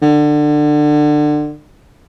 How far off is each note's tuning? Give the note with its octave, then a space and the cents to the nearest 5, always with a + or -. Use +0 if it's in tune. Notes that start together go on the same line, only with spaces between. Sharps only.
D3 +25